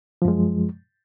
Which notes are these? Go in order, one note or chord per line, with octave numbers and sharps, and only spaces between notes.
F#2 F3 G#3